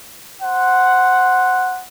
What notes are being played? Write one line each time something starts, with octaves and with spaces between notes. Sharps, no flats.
C5 F#5